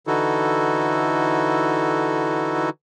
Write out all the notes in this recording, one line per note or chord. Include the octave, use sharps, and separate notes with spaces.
D3 E3 D#4 E4 F#4 A4